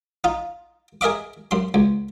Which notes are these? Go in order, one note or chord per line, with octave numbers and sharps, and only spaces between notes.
D#4 F4
G#4 A#4 D#5 E5 D6
F#2 C6
C#2